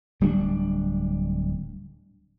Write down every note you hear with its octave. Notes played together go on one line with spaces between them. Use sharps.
D1 G3 C4 D4